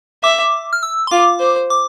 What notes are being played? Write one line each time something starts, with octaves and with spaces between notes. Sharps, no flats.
E5 D6
F6
E6
C6
F4 D6
C5
D6